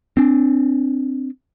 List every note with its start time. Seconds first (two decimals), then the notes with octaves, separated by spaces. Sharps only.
0.17 C4 D4